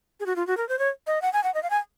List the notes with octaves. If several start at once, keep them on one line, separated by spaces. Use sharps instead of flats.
G#4
F#4
F4
F#4
A#4
C5
C#5
D#5
F#5
G#5
F#5
D#5
F5
G#5